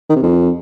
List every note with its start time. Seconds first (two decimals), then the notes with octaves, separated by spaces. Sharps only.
0.09 D#3
0.16 C3
0.23 F2